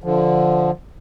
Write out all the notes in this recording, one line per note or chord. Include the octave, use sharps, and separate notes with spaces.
D3 F3